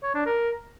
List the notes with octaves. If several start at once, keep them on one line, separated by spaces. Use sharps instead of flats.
C#5
D4
A#4